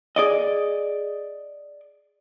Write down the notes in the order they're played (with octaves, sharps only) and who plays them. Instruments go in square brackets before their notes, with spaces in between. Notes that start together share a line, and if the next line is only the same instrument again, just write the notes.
[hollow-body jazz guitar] G#4 D5 D#5